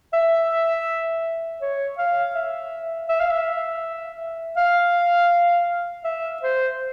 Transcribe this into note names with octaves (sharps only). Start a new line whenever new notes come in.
E5
C#5
F5
E5
E5
F5
E5
F5
E5
C5